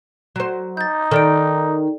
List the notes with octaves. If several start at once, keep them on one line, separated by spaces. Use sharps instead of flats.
F#3 C5
D#4 G6 A6
D#3 A4 D5 D7